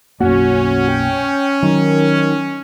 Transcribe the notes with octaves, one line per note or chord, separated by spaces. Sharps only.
B1 F#2 A#3 C#4 F#4
G5
D#3 F#3